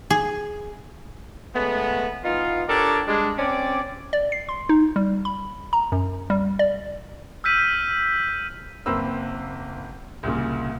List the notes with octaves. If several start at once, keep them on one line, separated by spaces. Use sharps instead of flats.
G#4
C#3 G#3 A3 B3
E3 B3 D#4 F4
D4 G4 A4 A#4 C#5 D5
G3 G#3 D4
C4 C#4 D5
D5
C7
C6
D#4
G3
B5
A#5
F#2
G3
D5
E6 F6 G6 B6 D#7
F#1 A#3 C4 B4 E6
C2 A#2 C#3